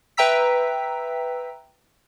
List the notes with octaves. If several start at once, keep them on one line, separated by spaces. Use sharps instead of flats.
B4 E5 G5 A#5 E6 B6